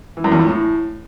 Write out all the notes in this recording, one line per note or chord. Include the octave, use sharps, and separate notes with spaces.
E3
F#2
E2
F2
A2